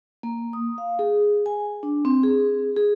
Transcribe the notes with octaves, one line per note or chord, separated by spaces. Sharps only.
A#3
D#6
F5
G#4
G#5
D4
C4
G#4
G#4